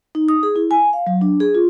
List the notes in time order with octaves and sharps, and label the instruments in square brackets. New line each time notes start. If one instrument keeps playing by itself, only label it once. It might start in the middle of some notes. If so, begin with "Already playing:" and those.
[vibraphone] D#4
D#6
G#4
E4
G#5
F5
F#3
D4
G#4
F4